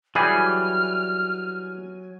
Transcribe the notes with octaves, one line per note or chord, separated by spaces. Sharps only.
E3 F#3 G3 G#4 G#5 F6